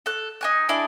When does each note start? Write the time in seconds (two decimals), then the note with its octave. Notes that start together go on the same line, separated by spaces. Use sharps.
0.06 A4 F#6
0.41 D#4 G#5 F#6
0.69 D4 E4 G#4 D#5